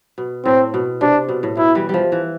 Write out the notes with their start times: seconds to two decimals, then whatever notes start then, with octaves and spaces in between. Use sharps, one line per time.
0.18 B2
0.45 A2 C4
0.74 B2
1.01 C3 D4
1.29 B2
1.43 A2
1.57 B2 E4
1.75 E3 G3
1.89 F3 G3
2.12 E3